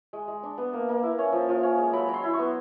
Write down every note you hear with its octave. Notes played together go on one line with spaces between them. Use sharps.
G#3
G#3
D4
B3
A#3
A#3
E4
C#4
F3
F3
C#4
G#3
F#3 B5
F#3
C6
E4
C#6
B3